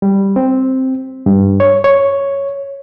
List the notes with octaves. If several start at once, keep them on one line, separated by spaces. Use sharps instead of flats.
G3
C4
G2
C#5
C#5